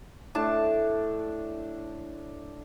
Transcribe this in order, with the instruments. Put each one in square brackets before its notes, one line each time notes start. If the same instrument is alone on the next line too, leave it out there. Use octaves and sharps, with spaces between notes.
[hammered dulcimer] A2 D4 A5